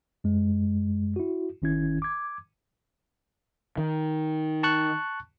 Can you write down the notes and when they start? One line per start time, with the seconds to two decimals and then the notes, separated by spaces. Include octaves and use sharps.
0.24 F#2 G#3
1.16 E4 F#4
1.62 G#1 D#3 C#4 E4 G#6
2.02 D6 G#6
3.78 D#3
4.63 A5 C#6 F#6